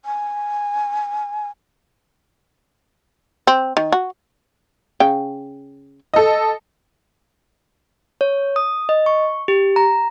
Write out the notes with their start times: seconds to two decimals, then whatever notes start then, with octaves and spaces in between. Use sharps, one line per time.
0.05 G#5
3.47 C4
3.77 D#3
3.92 F#4
5.00 C#3 G5
6.14 A4 D#5
8.21 C#5
8.56 D#6
8.89 D#5
9.06 C#6
9.48 G4
9.76 A#5